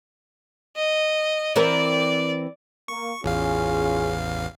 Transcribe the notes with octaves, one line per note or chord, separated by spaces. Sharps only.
D#5
E3 C4 A#4 D5
A#3 C#6
A1 E2 C#4 F4 G#4 F5